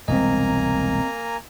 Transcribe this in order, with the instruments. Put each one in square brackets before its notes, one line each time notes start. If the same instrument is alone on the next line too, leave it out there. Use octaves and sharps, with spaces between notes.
[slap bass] E1 C2 G#3 [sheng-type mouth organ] A#3 G#5 A#5 [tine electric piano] C4 D#5